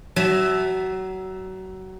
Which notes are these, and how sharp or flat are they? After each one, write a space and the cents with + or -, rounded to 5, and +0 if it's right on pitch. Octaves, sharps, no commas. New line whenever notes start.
F#3 +25 E5 +0 A5 -15